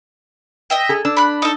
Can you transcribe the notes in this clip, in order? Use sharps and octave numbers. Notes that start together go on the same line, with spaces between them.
D#5 E5 G5
G#4 A4
D4 E6
B5 F#6
D#4 A4